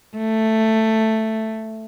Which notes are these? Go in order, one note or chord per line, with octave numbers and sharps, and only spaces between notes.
A3